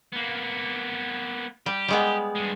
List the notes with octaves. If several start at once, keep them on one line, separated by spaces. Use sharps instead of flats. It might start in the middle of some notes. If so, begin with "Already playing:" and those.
A#3 B3
G3 G4
G3 G#3 B3
G2 G#3